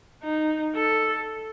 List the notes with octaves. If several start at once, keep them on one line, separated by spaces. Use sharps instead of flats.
D#4
A4